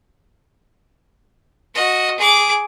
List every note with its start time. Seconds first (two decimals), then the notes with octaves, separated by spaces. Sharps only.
1.75 F#4 D#5
2.18 G#4 D6